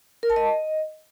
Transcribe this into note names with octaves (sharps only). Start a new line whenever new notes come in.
A#4
A5
D#5